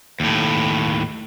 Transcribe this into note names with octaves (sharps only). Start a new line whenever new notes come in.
D#2 A2